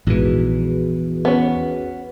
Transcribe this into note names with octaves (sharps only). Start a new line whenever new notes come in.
A#1 E2 G#2 E3 F#4 G#4 B4
B3 C#4